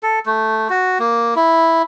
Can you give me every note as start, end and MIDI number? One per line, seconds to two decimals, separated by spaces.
0.03 0.19 69
0.26 0.68 57
0.70 0.98 66
1.00 1.34 58
1.36 1.82 64